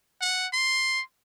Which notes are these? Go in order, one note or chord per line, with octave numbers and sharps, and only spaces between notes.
F#5
C6